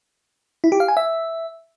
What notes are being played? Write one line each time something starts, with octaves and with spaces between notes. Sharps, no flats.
E4
G4
F5
G#5
E5